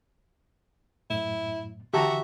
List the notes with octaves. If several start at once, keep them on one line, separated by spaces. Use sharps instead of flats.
F#2 A2 E4
D3 E3 F#4 G4 E5 A5 A#5